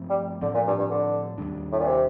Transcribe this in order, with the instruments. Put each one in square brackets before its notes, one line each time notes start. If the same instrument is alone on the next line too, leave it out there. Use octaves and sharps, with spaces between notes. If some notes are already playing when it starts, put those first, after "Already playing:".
Already playing: [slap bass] G2 F3 A3 C4
[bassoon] G3
[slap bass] A2 F3 C4 [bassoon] D3
[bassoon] A#2
G2
G2
D3
[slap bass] D#2 D#3 G3 D4
[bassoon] A2
A#2
C3